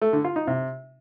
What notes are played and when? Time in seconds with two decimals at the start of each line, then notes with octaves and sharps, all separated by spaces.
0.02 A3
0.13 D3
0.24 F4
0.36 D#4
0.47 C3